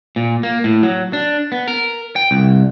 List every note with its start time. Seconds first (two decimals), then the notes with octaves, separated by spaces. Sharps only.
0.16 A#2
0.43 A#3
0.64 A2
0.83 F#3
1.13 D4
1.52 B3
1.68 A#4
2.16 G5
2.31 C2